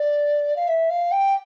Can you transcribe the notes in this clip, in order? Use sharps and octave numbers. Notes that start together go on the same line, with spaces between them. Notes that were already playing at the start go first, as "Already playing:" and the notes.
Already playing: D5
F5
E5
F5
G5